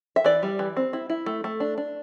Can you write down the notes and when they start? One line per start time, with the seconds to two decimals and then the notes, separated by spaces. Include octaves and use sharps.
0.16 E5
0.24 E3 D5
0.43 G3
0.59 E3
0.76 C4
0.93 E4
1.10 E4
1.26 A3
1.44 A3
1.60 D4
1.78 D4